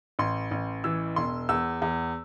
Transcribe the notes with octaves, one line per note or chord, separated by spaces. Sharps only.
A1 C6
A1
E3 E6
E1 C6
E2 E6
E2